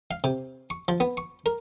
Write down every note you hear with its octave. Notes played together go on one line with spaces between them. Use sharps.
F5
C3
C#6
F3
B3
C#6
A#4